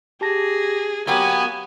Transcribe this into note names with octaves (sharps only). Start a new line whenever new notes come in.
G4 G#4 A5 A#6
F#3 A#3 B3 G4 G#5 G#6